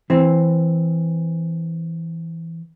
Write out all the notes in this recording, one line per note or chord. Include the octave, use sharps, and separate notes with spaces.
E3 C4